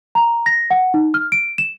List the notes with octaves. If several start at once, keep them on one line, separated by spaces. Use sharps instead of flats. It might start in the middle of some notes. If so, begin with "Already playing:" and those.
A#5
A#6
F#5
D#4
F6
D7
E7